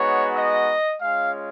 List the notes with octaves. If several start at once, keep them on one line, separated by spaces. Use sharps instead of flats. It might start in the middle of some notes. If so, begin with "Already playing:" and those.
Already playing: G#3 B3 D#4 F#4 C#5
D#5
G#3 C#4 F4 F5